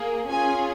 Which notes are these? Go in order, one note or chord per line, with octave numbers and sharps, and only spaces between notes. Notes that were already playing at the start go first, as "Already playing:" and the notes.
Already playing: A#3 G#4
C#4 F4 G#4 G#5